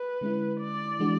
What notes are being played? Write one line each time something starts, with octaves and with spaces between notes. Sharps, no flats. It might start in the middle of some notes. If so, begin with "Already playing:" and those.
Already playing: B4
D3 G#3 C#4 E4
D5
E3 G#3 D4 F#4